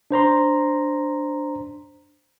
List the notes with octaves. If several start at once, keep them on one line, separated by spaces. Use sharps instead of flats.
D4 C5 A#5 C6